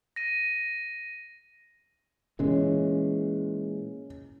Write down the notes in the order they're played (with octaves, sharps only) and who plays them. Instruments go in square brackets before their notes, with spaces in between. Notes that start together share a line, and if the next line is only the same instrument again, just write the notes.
[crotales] A#6 D#7
[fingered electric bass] A#2 E3 G#3 [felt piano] C#4